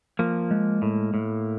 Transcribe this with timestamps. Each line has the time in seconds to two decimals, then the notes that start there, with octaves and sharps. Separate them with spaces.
0.19 F3 A#3
0.51 G#3
0.82 A2
1.14 A2